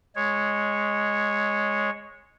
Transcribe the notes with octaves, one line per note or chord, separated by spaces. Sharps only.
G#3 C#5